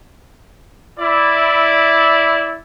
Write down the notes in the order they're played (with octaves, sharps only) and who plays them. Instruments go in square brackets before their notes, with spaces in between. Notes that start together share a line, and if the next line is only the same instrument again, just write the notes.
[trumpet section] E4 D5